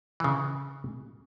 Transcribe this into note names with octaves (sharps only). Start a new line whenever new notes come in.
C#3 E3